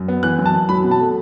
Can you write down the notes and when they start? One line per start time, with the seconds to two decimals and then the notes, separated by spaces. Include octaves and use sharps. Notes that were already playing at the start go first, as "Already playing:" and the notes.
Already playing: F#2
0.08 B3
0.23 E3 F#6
0.39 F#2
0.46 A5
0.53 F#2
0.69 F#3 B5
0.84 B2
0.91 A5
1.00 A3